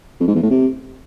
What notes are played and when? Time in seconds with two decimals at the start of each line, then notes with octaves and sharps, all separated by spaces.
0.20 F2
0.28 G#2
0.35 E2
0.43 A2
0.50 C3